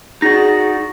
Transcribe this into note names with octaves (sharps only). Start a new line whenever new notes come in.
D#4 F#4 G#4 D5 A#6